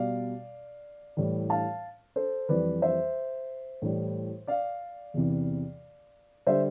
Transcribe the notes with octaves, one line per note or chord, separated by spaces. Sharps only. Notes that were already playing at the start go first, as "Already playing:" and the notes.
Already playing: B2 G3 D5 F5
A2 E3 G3
F5 A5
A4 C5
F2 E3 G3 B4 D5
C5 E5
A2 E3 G3
D5 F5
E2 C3 E3
D3 G3 C5 E5